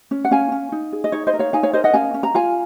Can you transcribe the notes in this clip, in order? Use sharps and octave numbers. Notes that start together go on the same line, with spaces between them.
C#4
F#5
C#4 F5 G#5
C#4
D#4
G#4
D#5
D#4 C#5
C5 D#5
A#4
C#5 F5
D#4 F5 G#5
C#5 F5
A#4 C5 D#5
D#5 F#5
C#4 F5 G#5
C#4
A#5
F4 F5 G#5